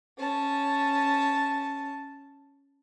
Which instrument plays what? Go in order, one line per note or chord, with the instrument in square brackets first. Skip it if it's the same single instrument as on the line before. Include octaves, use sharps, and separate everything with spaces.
[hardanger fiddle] C#4 A5